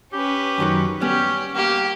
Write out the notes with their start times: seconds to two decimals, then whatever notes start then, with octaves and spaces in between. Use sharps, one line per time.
0.13 C#4 G4 B4
0.58 F#2 D#3 F#3
1.01 G3 B3 C#4 G4
1.55 A#3 G4